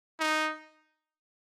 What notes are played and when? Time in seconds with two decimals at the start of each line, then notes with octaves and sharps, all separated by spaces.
0.20 D#4